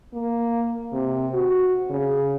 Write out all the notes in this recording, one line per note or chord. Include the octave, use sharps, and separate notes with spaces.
A#3
C3
F#4
C#3